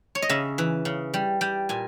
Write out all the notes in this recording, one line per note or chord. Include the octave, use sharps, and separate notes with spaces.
C#5
D#5
C#3 E5
E3
C#3
G3
G3 G5
A#2 G#5